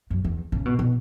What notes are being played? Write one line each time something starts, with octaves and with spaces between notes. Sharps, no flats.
F#2
E2
C#3
B2
B2